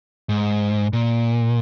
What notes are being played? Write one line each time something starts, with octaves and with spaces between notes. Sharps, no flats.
G#2
A#2